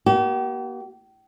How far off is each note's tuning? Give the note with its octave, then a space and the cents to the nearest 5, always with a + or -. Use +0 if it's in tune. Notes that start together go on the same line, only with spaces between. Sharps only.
A#3 +40 G4 -40